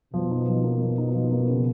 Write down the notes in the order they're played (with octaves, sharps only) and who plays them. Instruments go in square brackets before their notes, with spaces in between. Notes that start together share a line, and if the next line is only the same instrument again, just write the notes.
[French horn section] B2 [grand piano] F3
[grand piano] D#4
F3
A#3
F3
D#4
F3
A#3
C#3